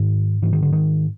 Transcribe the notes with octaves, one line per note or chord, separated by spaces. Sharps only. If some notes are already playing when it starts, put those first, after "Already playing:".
Already playing: G#2 D#3
G#2 E3
D#3
D3
D#3